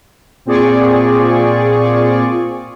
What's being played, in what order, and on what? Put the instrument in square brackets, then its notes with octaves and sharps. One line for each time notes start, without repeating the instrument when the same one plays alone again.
[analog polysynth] A#2 C4 F4 G#4 D5 C#6